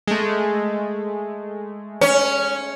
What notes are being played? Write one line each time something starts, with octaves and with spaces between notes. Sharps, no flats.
G#3 A3
C#4